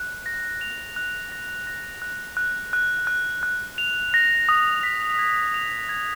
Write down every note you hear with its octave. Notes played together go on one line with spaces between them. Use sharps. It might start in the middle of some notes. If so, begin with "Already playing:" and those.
Already playing: F#6
A#6
F7
F#6
A#6
A#6
F#6
F#6
F#6
F#6
F#6
F7
A#6
D#6
B6
G#6
F7
G#6